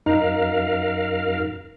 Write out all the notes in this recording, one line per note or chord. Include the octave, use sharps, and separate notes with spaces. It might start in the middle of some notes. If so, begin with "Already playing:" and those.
F#2 D#4 A#4 F5